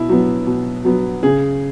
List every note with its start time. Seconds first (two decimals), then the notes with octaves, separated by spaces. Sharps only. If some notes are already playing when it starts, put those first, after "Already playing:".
Already playing: B2 E4
0.09 F#3 B3
0.47 B2
0.85 F#3 B3
1.23 C#3 G#4